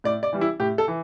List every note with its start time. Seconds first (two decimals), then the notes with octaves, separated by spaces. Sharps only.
0.04 A2 D5
0.23 D5
0.33 E3 G3
0.41 E4
0.60 A2 G4
0.78 A4
0.88 E3